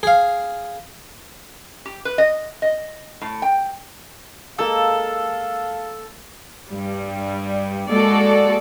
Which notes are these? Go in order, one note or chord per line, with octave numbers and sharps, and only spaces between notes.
G#4 F5
G4
B4
D#5
D#5
A2
G5
G#3 A#3 A4 F5
G2 G3
G#3 A#3 F#4 A4 D5